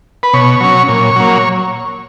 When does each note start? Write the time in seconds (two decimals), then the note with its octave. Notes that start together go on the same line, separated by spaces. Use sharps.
0.23 B4
0.33 B2 C#5
0.61 F#3 C#4
0.88 A#2
1.16 F#3 A#3